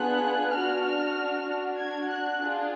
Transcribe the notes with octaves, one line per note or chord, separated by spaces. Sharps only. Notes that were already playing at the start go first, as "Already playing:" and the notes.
Already playing: B3 D4 F4 G#4 F#6
D4 F#4 F6
D4 F#4
G#6
F#6
D4 F4 G#4